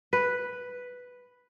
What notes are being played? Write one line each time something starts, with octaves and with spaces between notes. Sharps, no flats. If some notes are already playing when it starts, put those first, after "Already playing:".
B4